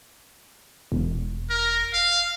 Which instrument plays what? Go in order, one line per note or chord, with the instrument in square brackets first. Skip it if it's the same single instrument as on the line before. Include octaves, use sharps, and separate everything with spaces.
[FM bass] E1
[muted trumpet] A#4
F5